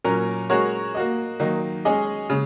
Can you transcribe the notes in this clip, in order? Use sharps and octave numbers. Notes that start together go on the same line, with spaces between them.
A#2 F#3 C#4 A#4
G#3 C#4 F#4 A#4 C#5
A#3 F#4 D#5
D#3 F#3 A#3 D#4
G#3 C#4 G#4 D#5
C#3 G#3